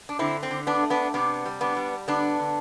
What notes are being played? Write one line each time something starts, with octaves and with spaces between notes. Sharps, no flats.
D4
D3 C4 E4
C4
D3
B3 D4
A3
B3 D4
C3 B3 D4
G3
B3 D4
G3
D3 B3 D4
D3